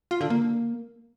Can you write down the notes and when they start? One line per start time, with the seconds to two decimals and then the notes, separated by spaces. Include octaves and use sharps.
0.11 F4
0.21 D3
0.30 A#3